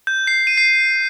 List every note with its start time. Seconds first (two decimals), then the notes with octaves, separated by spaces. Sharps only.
0.07 G6
0.27 C7
0.47 D#7
0.57 C7